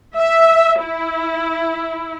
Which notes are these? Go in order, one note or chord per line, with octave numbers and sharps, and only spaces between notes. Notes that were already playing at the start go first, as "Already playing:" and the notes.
E5
E4